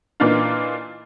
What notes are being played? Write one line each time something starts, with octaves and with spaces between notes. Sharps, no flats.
A#2 E3 A#3 D4 D#4 F4